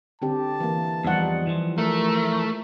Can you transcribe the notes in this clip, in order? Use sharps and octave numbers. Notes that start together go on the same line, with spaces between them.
D3 C4 G4 A5
E3 A#3
E2 F3 G3 D#4 F#5
E3 F3
A3 A#4